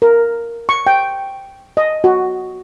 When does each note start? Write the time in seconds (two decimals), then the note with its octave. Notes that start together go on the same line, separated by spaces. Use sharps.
0.02 A#4
0.69 C#6
0.87 G5
1.77 D#5
2.04 F#4